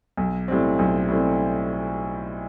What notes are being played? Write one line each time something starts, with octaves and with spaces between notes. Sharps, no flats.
B1
A2 G3 C4
B1
A2 G3 C4